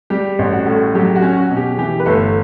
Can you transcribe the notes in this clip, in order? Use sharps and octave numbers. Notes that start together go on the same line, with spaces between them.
G3 G4
A1
F#4
A2
F#3 G4
F#4
C#4
F#4
B2
G4
E3 G4
B4
G1 A3 A4